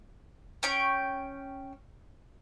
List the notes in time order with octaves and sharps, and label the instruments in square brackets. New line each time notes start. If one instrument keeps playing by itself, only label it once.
[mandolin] C#4 G5 C#6